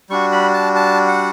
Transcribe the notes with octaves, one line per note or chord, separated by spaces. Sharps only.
G3 D4 F#4 C#6
B5
A5
A5
F#5